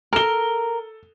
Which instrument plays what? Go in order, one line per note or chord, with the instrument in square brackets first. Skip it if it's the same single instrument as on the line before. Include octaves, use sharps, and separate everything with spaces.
[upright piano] A4 G7 [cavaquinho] A#4